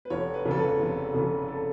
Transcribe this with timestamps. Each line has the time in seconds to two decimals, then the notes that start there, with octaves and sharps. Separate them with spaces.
0.05 B4
0.10 F1 C#5
0.34 B4
0.45 F2 C#3
0.51 A4
0.57 B4
0.80 F1
1.14 F2 C#3
1.48 A4